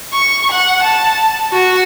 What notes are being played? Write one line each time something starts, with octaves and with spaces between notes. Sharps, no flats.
C#6
F#5
A5
F#4